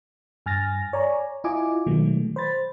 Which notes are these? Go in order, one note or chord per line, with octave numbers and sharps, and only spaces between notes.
G2 G#5 F6 A6 A#6
C#5 D5 G#5 A#5
E4 F4 D#5 G#5 D6
B2 D#3 F#3 G#3 A3
C5 B5 A6